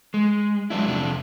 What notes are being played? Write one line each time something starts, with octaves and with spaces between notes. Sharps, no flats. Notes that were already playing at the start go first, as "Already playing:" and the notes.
G#3
F#3 G#3 D4 E4
F2 C3 D4